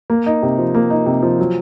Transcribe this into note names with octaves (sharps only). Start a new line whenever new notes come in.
A#3
D#4
C3
F3
A#3
D#4
C3
F3
F#3